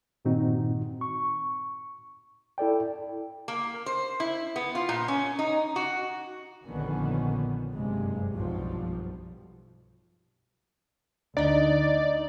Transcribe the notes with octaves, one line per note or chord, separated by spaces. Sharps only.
G2 A#2 D#3 C4 D#4 F#4
C#6
E4 A4 D5 G5
A#3
C5
E4
B3
F4
A#2
C#4
D#4
F#4
A#1 F2 D3 D#3 B3 C#4
F#1 G2 C3 G#3
B1 G2 F3
D2 D4 D#4 D5 D#5